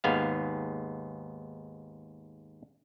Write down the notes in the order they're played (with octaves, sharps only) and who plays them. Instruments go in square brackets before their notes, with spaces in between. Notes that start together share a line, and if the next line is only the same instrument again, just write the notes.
[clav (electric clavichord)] D#2 G#2 B3 F5